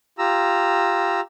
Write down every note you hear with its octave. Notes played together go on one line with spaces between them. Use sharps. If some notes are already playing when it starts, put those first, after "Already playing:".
F4 G4 A#5 E6